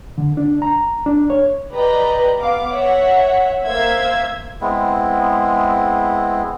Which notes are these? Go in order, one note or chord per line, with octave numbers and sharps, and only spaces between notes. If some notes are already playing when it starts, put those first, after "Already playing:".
D3
D4
A#5
D4
C#5
G4 B4 D5 D#5 A#5
B3 F5 D6
C#5 E5 F#5
A#3 C5 E5 F5 E6 G#6
G#3 B3 C4 E4